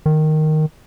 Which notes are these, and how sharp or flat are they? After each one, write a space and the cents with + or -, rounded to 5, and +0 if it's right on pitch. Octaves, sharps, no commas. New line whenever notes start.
D#3 -5